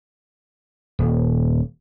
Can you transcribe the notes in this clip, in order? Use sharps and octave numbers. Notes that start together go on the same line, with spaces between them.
D#1